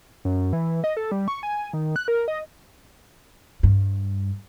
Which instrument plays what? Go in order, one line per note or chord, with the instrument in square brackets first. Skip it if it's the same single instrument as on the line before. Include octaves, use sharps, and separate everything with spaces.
[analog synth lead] F#2
E3
D#5
A4
G3
C#6
G#5
D#3
F#6
A#4
D#5
[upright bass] G2